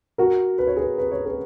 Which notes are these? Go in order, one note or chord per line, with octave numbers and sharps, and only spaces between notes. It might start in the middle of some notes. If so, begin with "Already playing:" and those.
F#4 A#4
B4
C#5
G#4 B4
B4
C#5
G#4 B4